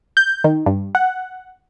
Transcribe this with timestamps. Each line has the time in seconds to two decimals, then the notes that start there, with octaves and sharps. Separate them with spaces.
0.17 G6
0.44 D#3
0.66 G2
0.95 F#5